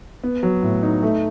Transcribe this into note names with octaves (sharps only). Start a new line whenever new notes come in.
B3
F#3
A2
D#4
A3